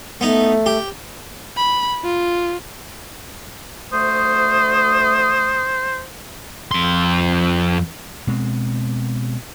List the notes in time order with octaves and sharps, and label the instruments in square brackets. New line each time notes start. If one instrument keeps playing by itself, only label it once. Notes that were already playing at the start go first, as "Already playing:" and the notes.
[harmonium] A3 [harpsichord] B3 D#4
[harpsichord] G4
[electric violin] B5
F4
[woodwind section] D2 A3 D#6 [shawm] C5
[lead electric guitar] F2 C6
[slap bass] B2 G#3 C4